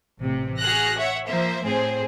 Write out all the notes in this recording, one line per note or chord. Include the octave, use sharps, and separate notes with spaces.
A1 C3
F#4 G#4 F6 F#6 A#6
C#5 E5 F#5
F3 A#3 C5 E5
A2 C4 G#4 C5